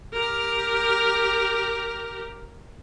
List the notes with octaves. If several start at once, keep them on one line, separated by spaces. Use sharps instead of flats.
G4 A#4